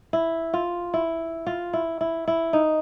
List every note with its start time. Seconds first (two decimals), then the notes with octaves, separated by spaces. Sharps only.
0.13 E4
0.54 F4
0.94 E4
1.47 F4
1.73 E4
2.01 E4
2.28 E4
2.53 D#4